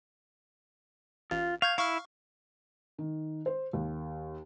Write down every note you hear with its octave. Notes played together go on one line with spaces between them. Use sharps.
A1 F4
F5 C#6 G6 G#6
E4 F5 C#6 F6
D#3
C5
D#2